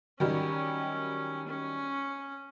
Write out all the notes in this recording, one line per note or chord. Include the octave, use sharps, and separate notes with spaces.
D#3 F#3 G3 C#4
C#4